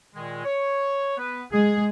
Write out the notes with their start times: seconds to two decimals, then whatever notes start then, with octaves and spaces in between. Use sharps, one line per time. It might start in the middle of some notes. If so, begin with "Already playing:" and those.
0.15 A#2 D#3 G#3
0.44 C#5
1.17 B3 B4
1.52 G#3 G#4